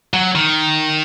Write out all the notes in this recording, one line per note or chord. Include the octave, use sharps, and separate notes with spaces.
F#3
D#3